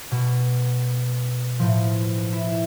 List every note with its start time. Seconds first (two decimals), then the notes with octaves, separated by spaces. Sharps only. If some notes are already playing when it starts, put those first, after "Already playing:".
0.12 B2
1.59 A2 F3
2.33 E4